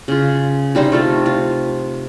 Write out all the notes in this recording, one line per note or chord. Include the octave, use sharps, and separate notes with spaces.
C#3 F4
C3 G3 D#4 C5
A3 F4 A4
F4